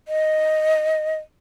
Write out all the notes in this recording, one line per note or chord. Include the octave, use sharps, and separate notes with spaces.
D#5